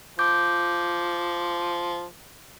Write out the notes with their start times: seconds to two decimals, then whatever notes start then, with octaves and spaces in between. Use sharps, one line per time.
0.19 F3 D6 G6